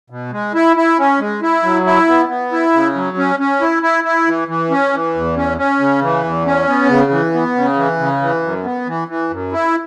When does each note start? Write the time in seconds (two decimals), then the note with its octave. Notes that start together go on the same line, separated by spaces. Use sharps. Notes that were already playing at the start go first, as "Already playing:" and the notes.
0.10 B2
0.32 G#3
0.54 E4
0.77 E4
0.99 C#4
1.19 G#3
1.42 E4
1.63 F#3
1.86 E4
2.08 B3
2.29 B3
2.52 E4
2.74 C#3
2.95 F#3
3.17 C#4
3.39 C#4
3.61 E4
3.83 E4
4.04 E4
4.26 E3
4.48 E3
4.70 C#4
4.93 E3
5.15 E2
5.36 C#4
5.58 C#4
5.80 C#3
6.02 E3
6.24 E2
6.46 C#4
6.68 B3
6.89 C#3
7.11 E3
7.33 B3
7.55 C#3
7.76 E3
7.99 C#3
8.21 E3
8.42 F#2
8.64 B3
8.87 E3
9.08 E3
9.30 F#2
9.52 E4